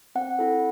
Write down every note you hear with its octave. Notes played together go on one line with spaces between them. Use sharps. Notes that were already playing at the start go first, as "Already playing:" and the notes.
C4 F#5
E4 A4